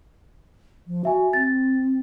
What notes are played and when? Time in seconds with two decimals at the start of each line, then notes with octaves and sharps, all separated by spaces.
0.87 F3
1.05 F#4 E5 G#5
1.33 C4 A6